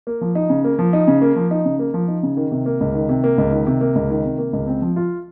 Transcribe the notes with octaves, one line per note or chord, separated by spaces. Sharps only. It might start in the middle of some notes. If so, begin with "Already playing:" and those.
A#3
F3
D#4
C#3
A#3
F3
D#4
C#3
A#3
F3
D#4
C#3
A#3
F3
D#4
C#3
D#3
C3
A#3
C#2
D#3
C3
A#3
C#2
D#3
C3
A#3
C#2
D#3
C3
A#3
C#2
C4
F3
F4